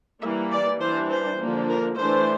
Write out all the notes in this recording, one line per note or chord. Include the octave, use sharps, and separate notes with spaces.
E3 G3 A#3 E5
D5
E3 G3 D4 C5
C5
D3 F3 A#3 D4
A#4
E3 A3 D4 C5